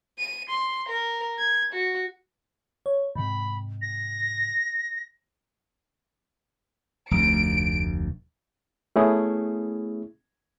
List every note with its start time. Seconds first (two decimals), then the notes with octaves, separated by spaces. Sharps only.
0.19 D#7
0.50 C6
0.89 A#4
1.39 G#6
1.73 F#4
2.86 C#5
3.16 G#2 C3 B5
3.82 A#6
7.11 F1 D2 D7
8.96 A3 B3 C#4 E4 G#4